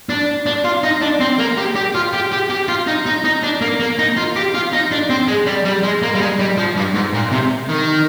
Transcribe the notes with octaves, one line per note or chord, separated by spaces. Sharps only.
D4
D4
F4
D#4
D4
C4
A#3
G4
G4
F4
G4
G4
G4
F4
D#4
D#4
D#4
D4
A#3
A#3
D#4
F4
G4
F4
D#4
D4
C4
G#3
G3
G3
G#3
A#3
G3
G#3
G3
F3
G2
G#2
A#2
C3
D#3